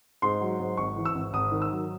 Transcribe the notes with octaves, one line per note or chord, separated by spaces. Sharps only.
G#2 C6
F#3
G#2
G#1 C#6
E3
E6
G#1
G#1 D#6
D#3
E6
F#3